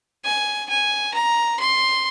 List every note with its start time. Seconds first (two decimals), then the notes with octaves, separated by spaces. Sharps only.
0.25 G#5
0.69 G#5
1.15 A#5
1.60 C6